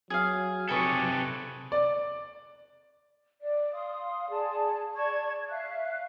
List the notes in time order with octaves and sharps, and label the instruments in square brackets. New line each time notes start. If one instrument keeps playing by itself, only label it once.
[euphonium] F#3 [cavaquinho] G#4 F5
[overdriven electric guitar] C3 A4 [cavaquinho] G#4 B4 C#6
[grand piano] D5
[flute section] D5
F5 C6 D#6
G#4 D5 A5
D5 A5 C#6 G#6
E5 F5 F#6